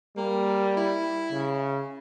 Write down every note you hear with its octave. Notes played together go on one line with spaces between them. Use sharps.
G3 A#3
E4
C#3